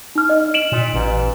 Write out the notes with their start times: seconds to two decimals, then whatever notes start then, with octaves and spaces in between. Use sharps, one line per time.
0.15 D#4 F6
0.29 D#5
0.54 D7 E7 F#7
0.72 A#2
0.94 A1